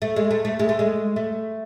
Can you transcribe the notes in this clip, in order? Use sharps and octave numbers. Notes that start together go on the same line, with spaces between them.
A3
G#3
A3
A3
G#3
A3
G#3
A3